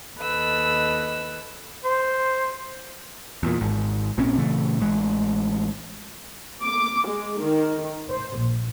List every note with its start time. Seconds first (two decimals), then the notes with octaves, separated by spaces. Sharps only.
0.19 D#2 A4 B4 D#5 E6
1.84 C5
3.43 E2 A#2
3.61 G#1 G#2
4.17 A#1 A#2 C4 C#4
4.38 A#2 C#3 E3 A3
4.81 A1 G#3
6.62 D6
7.07 G#3
7.40 D#3
8.10 C5
8.38 A#1